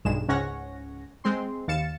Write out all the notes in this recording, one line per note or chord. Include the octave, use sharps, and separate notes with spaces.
B1 G2 G#3 E7
C#2 G#2 C#4 C#5 F#5 A#6
G#3 C4 C6
D#2 F5 A6 C#7 E7